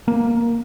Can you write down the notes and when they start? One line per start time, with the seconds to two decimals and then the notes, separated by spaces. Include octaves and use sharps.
0.08 A#3